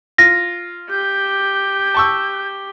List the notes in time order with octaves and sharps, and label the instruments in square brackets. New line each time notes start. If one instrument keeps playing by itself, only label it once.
[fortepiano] F4 [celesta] A#6
[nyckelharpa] G4 [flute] G6
[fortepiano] A5 C#6 E6